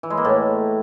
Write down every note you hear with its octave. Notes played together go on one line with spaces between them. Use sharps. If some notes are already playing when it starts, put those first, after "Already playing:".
E3
G#3
A#3
A2